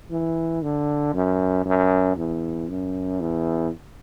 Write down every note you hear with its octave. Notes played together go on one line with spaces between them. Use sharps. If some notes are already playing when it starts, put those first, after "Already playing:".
E3
D3
F#2
F#2
E2
F#2
E2